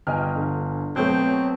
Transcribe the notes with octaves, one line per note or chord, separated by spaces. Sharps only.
G1 D#5 G5 G#5 F6
D3
B2 F#3 A3 C4 G6